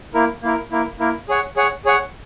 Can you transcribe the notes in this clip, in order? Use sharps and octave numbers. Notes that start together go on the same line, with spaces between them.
A#3 E4 A#4
A#3 E4 A#4
A#3 E4 A#4
A#3 E4 A#4
G#4 C#5 F#5
G#4 C#5 F#5
G#4 C#5 F#5